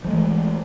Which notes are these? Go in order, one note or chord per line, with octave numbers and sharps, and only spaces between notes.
E3 F3 G#3 A3